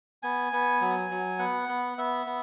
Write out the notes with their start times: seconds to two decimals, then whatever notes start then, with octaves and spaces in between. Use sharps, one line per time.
0.23 B3 G#5
0.53 B3
0.81 F#3
1.10 F#3
1.39 B3 F#5
1.69 B3
1.98 B3 E5
2.26 B3